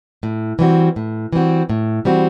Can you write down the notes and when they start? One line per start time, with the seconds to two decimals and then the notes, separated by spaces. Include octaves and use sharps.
0.23 A2
0.59 E3 G3 C4 F#4
0.96 A2
1.33 E3 G3 C4 F#4
1.70 A2
2.05 E3 G3 C4 F#4